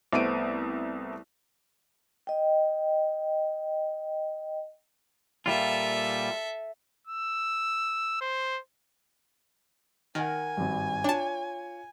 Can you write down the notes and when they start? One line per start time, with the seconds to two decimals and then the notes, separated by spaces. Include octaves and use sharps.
0.13 C2 A3 B3 C5 D7 D#7
2.27 D#5 G5
5.46 A#2 G3 F4 A4 E5
7.07 E6
8.21 C5
10.15 D#3 A#4 F#5 G#5
10.57 G#1 G2
11.04 D4 F4 C#5 A5